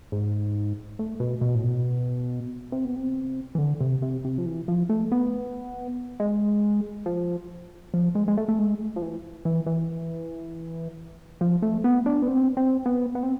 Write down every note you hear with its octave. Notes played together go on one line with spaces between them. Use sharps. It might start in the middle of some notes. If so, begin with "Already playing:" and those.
G#2
A2
B2
B2
A2
B2
C3
B2
C3
E3
D3
C3
C3
C3
F3
E3
F3
A3
B3
G#3
F3
F3
G#3
G#3
A3
A3
G#3
F3
E3
E3
E3
F3
A3
B3
D4
B3
C4
C4
B3
B3
C4